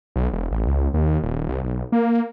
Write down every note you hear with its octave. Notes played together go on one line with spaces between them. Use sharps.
B1
E1
A1
C#2
D#2
D#1
C2
B1
A#3